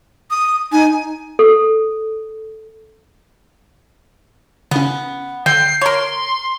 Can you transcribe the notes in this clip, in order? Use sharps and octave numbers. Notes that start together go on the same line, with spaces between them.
D#6
D#4 G#5
A4
C#3 B3 C#4
D3 G5 C7
A#4 C#5 C6